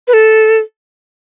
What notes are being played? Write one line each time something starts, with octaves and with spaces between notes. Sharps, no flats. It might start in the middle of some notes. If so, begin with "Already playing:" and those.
B4
A4